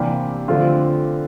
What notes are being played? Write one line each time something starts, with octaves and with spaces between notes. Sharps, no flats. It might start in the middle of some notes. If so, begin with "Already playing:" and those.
Already playing: C3 E3 A#3 D4 G4
D3 F3 A3 C4 F4